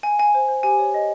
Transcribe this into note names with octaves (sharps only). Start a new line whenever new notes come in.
F5 G#5
F5 G#5
C5
C5
G4 G#5
C#5
D#5